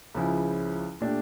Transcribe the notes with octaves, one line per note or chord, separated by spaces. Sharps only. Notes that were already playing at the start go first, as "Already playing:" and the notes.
C#2 C#3 F3 C#4 E4
A#2 A3 D4 G4